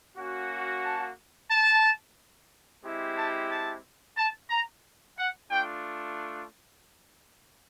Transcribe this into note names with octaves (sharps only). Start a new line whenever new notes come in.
A#3 C#4 F#4
A5
A5
G#3 C4 E4 G4
A5
A5
A5
A#5
F#5
A3 D4 F4 G5